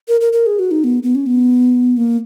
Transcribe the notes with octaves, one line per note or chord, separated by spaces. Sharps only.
A#4
A#4
A#4
G#4
F#4
D#4
B3
B3
C#4
B3
A#3